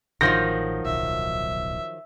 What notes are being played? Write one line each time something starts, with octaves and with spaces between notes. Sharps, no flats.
A1 D#3 F3 F#3 G6 A#6
D1 B1 E5